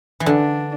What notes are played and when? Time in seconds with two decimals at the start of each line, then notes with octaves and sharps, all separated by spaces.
0.20 E3
0.26 D3 D4